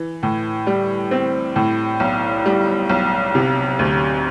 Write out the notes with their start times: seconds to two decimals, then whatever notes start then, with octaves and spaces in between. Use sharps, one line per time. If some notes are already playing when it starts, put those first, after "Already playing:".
Already playing: E3
0.23 A2
0.67 G3
1.11 C4
1.56 A2
2.00 B1
2.45 G3
2.89 B1
3.35 C3
3.79 D2